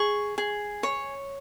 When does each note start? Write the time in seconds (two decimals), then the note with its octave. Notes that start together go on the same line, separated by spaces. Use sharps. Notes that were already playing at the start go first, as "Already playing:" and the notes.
Already playing: G#4 C#6
0.38 G#4
0.83 C#5